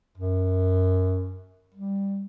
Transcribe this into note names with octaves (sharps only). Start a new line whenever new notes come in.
F#2
G3